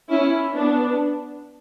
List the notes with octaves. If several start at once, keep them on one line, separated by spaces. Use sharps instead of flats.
C#4 E4
B3 D4